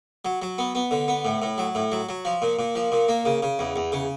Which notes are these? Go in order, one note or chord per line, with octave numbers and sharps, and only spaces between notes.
F#3
F#3
B3
B3
D3
B3
A2
A2
F#3
A2
F#3
F#3
F3
A#2
A#2
F3
A#2
A#3
C#3
C#3
E2
E2
C#3